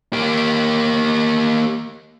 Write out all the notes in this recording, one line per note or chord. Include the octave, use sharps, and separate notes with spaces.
A#3 G4